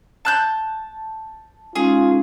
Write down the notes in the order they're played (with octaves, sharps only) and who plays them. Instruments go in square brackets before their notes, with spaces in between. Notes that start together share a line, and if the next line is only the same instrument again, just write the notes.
[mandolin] A5 F#6 G6
[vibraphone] G#3 C#4 D#4 [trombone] F4 [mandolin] G#4